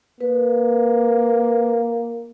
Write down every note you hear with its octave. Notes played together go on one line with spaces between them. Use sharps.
A#3 B4